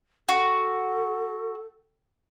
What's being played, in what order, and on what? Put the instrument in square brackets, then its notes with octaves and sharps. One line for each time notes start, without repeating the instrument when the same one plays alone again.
[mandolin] F#4 [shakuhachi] A4